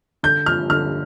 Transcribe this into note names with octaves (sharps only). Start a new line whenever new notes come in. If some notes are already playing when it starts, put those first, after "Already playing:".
D3 G6
F3 F6
D3 F6